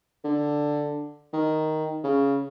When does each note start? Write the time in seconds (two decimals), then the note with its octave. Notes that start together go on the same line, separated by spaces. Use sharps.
0.24 D3
1.33 D#3
2.04 C#3